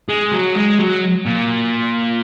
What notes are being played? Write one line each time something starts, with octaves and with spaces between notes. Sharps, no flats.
G#3
F#3
G#3
F#3
A#2